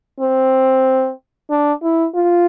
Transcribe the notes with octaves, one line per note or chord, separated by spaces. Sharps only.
C4
D4
E4
F4